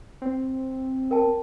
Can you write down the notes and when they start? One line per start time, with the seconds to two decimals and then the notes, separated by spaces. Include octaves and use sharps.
0.22 C4
1.11 A#4 G5 A5